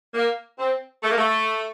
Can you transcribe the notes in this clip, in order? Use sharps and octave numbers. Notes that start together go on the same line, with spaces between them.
A#3
C4
A3
A#3
A3